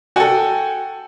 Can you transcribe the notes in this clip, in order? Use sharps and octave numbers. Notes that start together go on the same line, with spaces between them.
F#4 A4 G5 G#5